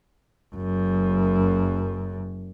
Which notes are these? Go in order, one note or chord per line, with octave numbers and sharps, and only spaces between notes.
F#1 F#2